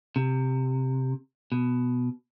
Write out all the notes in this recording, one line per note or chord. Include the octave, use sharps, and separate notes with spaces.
C3
B2